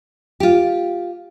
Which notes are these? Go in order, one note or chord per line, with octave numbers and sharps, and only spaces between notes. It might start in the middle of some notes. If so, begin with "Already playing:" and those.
F4 G4